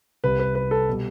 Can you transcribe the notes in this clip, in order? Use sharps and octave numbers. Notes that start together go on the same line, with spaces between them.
C2 C3 G3 B4
B4
B4
A4
B2 G3